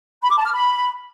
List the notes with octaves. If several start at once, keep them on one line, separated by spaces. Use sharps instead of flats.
B5
D6
A5
F6
B5